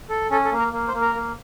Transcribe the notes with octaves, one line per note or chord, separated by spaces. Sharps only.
A4
C#4 A4
A4
A#3
A#4
A#3
C5
A#3
A#4
A#3